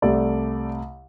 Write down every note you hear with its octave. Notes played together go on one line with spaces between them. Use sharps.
C2 C3 A3 A4 D5